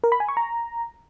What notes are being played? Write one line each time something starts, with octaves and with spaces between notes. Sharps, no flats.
A#4
B5
G#5
C#6
A#5